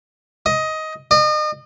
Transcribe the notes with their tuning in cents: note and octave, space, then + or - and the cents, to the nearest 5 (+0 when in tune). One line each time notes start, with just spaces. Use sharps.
D#5 +15
D#5 -35